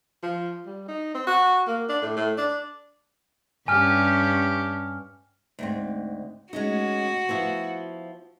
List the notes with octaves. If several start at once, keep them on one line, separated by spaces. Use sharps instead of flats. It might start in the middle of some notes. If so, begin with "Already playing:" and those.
F3
G3
D#4
C4
F#4
A#3
D4
A2
A2
D4
G2 C#4 G4 G#5 F6
D2 G#2 C4
G#3 C#4 D#4 F#4
F3 B3 E4